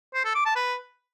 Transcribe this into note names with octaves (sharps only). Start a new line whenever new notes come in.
C5
A4
D6
A5
B4